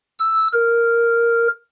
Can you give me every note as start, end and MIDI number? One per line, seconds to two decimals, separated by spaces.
0.19 0.48 88
0.53 1.48 70